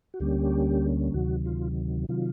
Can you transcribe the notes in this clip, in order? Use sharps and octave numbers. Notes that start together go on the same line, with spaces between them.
F#4
D2 D3 G3 A#3 C#4 G4
D2 C3 D#3 F#3 F#4
F4
C3 D#3 F#3 F4